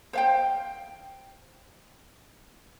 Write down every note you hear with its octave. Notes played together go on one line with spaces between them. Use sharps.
C5 F5 G5